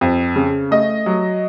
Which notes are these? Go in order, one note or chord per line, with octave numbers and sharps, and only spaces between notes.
F2
C#3
A3 D#5
F#3